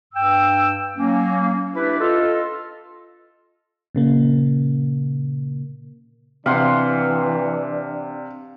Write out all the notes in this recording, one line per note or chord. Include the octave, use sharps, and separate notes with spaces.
G2 G5 E6
F#3 A#3 C#4
D4 E4 G4 B4
F4 A4 D#5
A#2 C#3 A#3
C3 E3 D4 F5 F#5 C6